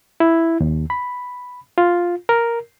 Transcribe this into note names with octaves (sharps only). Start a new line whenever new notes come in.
E4
D#2
B5
F4
A#4